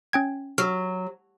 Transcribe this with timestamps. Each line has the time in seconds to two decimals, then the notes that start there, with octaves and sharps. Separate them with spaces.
0.13 C#4 G5 G#6
0.58 F#3 E6 F6